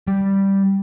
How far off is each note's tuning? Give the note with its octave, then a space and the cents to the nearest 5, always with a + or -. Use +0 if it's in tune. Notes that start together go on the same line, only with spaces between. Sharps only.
G3 +0